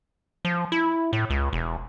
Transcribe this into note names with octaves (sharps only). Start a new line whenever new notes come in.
F3
E4
A2
C#2
E1